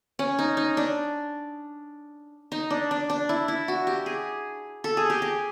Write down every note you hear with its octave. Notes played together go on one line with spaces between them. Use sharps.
C#4
D#4
D#4
D4
D#4
D4
D4
D4
E4
E4
F#4
G4
G#4
A4
G#4
G4
G#4